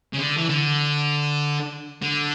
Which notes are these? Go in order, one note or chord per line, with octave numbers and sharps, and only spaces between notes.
C#3
D3
E3
D3
D3